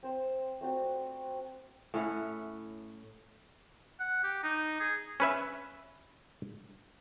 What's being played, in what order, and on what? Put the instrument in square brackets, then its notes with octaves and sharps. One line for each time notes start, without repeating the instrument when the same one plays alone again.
[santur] C4 C5
A3 C4 F#4 D5
[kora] A2 C#4 E4 F#5
[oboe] F#5
G4
D#4
G#4
[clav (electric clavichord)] C#4 B4 E5